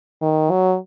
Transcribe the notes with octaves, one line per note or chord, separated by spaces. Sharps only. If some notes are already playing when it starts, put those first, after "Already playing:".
D#3
F#3